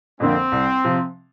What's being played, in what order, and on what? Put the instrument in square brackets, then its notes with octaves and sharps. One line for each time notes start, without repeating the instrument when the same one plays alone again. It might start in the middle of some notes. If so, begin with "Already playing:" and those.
[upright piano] F2 D3 A#3 [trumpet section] C4
[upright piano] C2
C3 F3